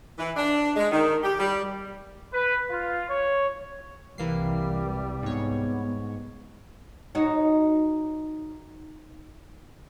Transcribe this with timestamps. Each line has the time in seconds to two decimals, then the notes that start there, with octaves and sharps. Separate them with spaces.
0.19 E3
0.37 D4
0.76 G#3
0.92 D#3
1.24 G4
1.39 G3
2.33 B4
2.70 F4
3.09 C#5
4.18 C2 E3 G3 A#3 C7
5.23 G#2 B3 C#5
7.15 D#4 F#4 C#5